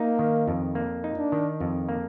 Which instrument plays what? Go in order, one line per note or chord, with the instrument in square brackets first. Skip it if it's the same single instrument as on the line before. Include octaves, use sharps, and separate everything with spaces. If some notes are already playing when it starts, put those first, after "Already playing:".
Already playing: [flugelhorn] A#3 [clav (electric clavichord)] D#4
[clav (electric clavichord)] D#3
F2
A#3
D#4
[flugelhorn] D4
[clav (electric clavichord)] D#3
F2
A#3